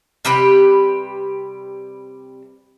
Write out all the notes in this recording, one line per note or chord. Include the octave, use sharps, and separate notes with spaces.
C3 G3 G4 B4